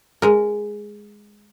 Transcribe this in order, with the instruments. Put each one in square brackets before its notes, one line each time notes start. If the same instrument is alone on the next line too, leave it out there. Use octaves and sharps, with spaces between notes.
[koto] G#3 A#4